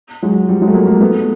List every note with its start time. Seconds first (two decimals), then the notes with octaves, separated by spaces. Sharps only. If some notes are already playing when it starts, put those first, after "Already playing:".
0.22 F#3 G#3
0.49 F3 G3
0.62 F#3 G#3
0.67 A3
0.74 G#3 A#3
0.87 G#3 A#3
1.01 A3 B3